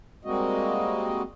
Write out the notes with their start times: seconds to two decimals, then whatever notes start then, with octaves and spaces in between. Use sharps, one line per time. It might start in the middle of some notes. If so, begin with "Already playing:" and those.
0.25 G3 G#3 A#3 C4 F#4 D#5